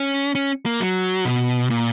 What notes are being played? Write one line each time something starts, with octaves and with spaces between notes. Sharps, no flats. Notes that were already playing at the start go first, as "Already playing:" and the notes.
Already playing: C#4
C#4
A#3
F#3
B2
A#2